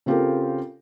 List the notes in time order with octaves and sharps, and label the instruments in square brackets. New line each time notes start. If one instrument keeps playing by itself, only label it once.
[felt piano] C#3 C4 F4 G4 A4 A#4